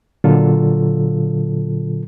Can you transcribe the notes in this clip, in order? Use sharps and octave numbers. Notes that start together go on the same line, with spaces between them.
A#2 D3 F#3 F4 A4